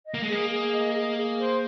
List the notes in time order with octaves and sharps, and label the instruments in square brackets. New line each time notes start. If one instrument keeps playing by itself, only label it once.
[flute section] D#5
[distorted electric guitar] A#3
G#3
[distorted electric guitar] A#3 [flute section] G#4
[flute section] G#4
D#5
G#4
G#4
C5